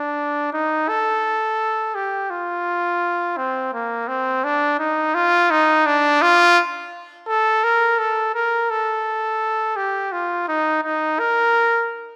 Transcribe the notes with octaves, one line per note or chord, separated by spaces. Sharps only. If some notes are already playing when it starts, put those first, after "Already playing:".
Already playing: D4
D#4
A4
G4
F4
C4
A#3
C4
D4
D#4
F4
D#4
D4
F4
A4
A#4
A4
A#4
A4
G4
F4
D#4
D#4
A#4